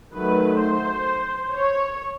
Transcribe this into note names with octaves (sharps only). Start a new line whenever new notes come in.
D#3 F#3 A3 B4
C5
C#5